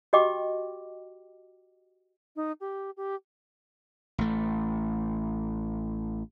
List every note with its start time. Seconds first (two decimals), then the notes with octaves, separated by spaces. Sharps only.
0.13 F#4 G4 D#5 G5 D6
2.36 D#4
2.61 G4
2.97 G4
4.18 A1 A3